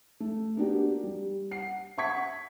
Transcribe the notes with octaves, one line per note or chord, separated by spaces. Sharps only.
A3
A#3 B3 D4 F#4 G4
G3
F#5 C7
E5 F#5 C#6 G#6 B6